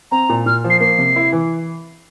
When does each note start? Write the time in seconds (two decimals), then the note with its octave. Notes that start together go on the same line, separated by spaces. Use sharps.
0.11 C4 A#5
0.29 A#2
0.46 A#2 F6
0.64 F3
0.70 C7
0.80 A#3 C7
0.98 C3
1.16 E4
1.32 E3